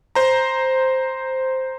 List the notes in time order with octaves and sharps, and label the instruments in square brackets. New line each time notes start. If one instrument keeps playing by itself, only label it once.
[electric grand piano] C5 A#5